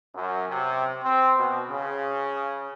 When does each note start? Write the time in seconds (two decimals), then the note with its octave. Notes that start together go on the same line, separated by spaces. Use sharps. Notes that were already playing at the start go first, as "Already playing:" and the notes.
0.15 F#2
0.49 C3
1.03 C4
1.38 B2
1.70 C#3